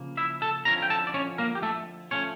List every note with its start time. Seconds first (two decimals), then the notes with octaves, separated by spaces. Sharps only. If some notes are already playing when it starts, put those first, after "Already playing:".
Already playing: C#3 F3 A#3
0.17 E4 E5
0.42 A4 A5
0.65 F2 D3 F3 C#4 E4 A#4 A#5
0.82 G5
0.90 A4 A5
1.07 D5
1.14 C#4 C#5
1.38 A#3 A#4
1.55 G4
1.63 A3 A4
2.11 F3 A3 C#4 C#5